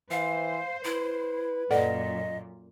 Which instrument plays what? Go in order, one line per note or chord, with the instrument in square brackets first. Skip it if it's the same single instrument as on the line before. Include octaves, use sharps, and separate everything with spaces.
[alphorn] E3 [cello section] C5 [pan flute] F5
[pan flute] E4 [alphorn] B4
[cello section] F#2 A#2 [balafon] A4 D5 F#5 [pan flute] D#5